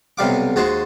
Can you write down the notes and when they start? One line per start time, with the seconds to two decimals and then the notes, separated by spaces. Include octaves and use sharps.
0.18 B1 C3 G3 F5 D6
0.56 D#2 G#3 F#4 C5 A5